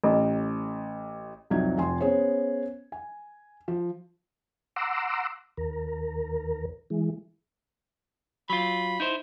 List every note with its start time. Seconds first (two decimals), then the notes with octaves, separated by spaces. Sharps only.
0.04 A1
1.50 C2 F2 F#3 D#4 G#6
1.77 F1 F2 G#5 C6
2.00 B3 C#4 G#4 C5 C#5
2.92 G#5
3.68 F3
4.76 F#5 A#5 C6 D6 E6
5.57 D#2 A#4
6.90 E3 G#3
8.50 F#3 F4 B5
9.00 D#4 E4 C5